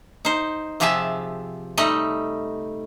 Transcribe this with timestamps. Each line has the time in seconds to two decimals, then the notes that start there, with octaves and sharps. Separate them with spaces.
0.25 D#4 C5
0.80 C3 F3 G4 G#4 E5 A5
1.78 G3 A3 D#4 D#5